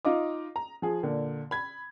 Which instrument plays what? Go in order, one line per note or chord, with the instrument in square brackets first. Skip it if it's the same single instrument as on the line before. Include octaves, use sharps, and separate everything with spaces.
[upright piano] D#4 F4 D#5 D6
A#5
F3 G#4
A#2 D3
B5 G#6